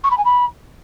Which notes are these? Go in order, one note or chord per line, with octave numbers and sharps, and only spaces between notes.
C#6
B5
G#5
B5